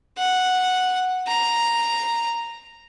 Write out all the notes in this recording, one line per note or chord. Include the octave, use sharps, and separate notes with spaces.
F#5
A#5